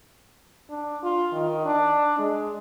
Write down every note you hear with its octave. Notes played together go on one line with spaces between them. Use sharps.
D4
F4
D#3
D4
G#3